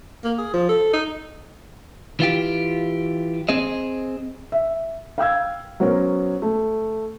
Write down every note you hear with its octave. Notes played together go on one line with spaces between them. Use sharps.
A#3
G#4
F3
A4
D#4
E3 F4 G4
C4 G#4 D#5
E5
F5 G5 E6 G#6
F#3 B3 C#4 A#4 C5
A3